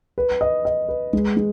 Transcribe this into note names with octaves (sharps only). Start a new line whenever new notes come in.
B4
D#5
D#5
B4
G#3
G#3